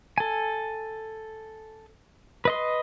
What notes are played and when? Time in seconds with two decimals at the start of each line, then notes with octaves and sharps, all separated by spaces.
0.18 A4 G#5
2.45 B4 D#5 C6